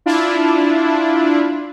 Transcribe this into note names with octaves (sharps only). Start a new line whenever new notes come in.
D4 E4 F4